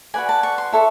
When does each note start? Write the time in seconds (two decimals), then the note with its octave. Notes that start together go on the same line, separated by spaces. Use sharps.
0.14 F#4 B4 D5 G#5
0.29 A5
0.43 C#6
0.58 C6
0.72 E4 A4 C#5 C#6